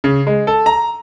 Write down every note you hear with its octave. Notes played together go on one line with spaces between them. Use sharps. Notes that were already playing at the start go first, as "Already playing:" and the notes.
C#3
G#3
A4
A#5